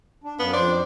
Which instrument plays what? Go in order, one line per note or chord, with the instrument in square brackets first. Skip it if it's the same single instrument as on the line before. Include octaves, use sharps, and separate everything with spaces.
[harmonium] D4
[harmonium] F#2 F5 [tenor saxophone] B3
[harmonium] F2 C5 [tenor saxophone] D4